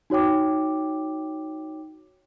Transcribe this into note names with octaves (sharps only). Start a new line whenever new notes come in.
D#4 F#4 C#5 G5 D6